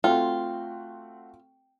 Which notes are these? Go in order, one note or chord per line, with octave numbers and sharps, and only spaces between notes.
A3 C4 F4 F#4 G5